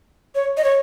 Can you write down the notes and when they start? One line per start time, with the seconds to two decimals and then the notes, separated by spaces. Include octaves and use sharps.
0.35 C#5
0.57 D#5
0.64 C#5